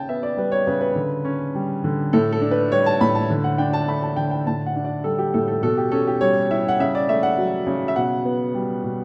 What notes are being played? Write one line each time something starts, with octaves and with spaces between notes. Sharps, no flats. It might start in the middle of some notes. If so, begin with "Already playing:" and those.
Already playing: C#3 G5 A5
B3 E5
D5
G3 B4
C#5
C#3 B4
B4
D3
C#4
G3
D3
A2 A4
A4
D4
B4
G3 C#5
A5
A2 B5
A5
D3
F#5
D4 G5
A5
A3 B5
A5
D3 G5
G5
A2 A5
F#5
D4
D5
G3 A4
G4
A2 A4
A4
B2 A4
G4
C#4 A4
G4
G3 C#5
E4 E5
F#5
C#3 E5
D5
A3 E5
F#5
F#3
C#3
E5
B2 F#5
B3
G3
B2